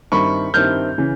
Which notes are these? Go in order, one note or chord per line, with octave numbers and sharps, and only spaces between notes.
G2 D#3 G3 C4 E4 B5 C#6
G2 D#3 G3 C4 E4 F6 G6
C#3 E3